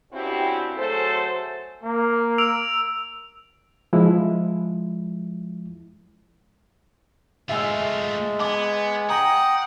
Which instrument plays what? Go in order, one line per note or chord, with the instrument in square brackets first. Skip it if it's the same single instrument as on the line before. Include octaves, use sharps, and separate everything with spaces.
[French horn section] G2 C4 C#4 E4 F#4 G4
F#3 A3 G#4 A4 C5
[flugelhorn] A#3
[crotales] E6 D7 F7
[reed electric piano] F3 G#3 E4
[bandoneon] G#3 [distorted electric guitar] A3 F4 [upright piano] E5 G#5 E6
[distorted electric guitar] B3 [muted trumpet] G#5 [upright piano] D6
[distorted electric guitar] F#5 [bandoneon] G5 D#6 [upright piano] A#5 A#6